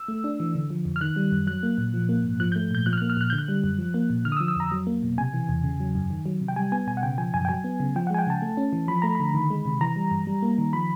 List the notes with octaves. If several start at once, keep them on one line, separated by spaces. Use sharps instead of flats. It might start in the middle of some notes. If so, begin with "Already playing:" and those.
Already playing: E6
A3
D4
E3
D3
F3
F2
F6
D#3 F#6
G3
F#2
F#3 F#6
A#3
A#2
F3
A#3
G#2
F3 F#6
G6
A3
A#2 G6
F3 F#6
F6
F#6
A#3
F6
A#2 F#6
D3 G6
F#6
G3
F#2
F3
A#3
A#2
D3 F6
D#6
E6
F3
E6
F2 A#5
F#3
A#3
B2
C3 G#5
E3
E2
C#3
F#3
F#2
D#3
F#3
C3
G5
G3 G#5
B3 G#5
B2 G#5
F#5
C#3 G5
F3 G#5
F#2 G#5
G5
F#3 G#5
B3
C#3
F3 G5
F#5
G#3 G#5
G5
C#3 A5
A3
C#4
E3
F3 B5
A3 A#5
D3 B5
D#3
G#3
C3
E3 A#5
G3
G2
G3
A#3
D#3
F3 B5